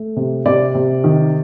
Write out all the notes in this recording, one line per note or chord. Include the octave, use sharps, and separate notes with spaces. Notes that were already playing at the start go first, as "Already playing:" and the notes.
Already playing: A3
C3
C3 D5
C3
D#3